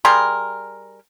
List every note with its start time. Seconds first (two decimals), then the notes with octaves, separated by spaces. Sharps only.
0.05 G3 G#4 A#4 C6